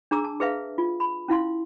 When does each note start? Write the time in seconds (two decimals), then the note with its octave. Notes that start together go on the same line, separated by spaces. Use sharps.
0.11 D4 G#4 A#5 D6 E6
0.24 A5
0.40 G#4 B4 E5 F5
0.78 F4
1.00 B5
1.28 C#4 E4 F5 C6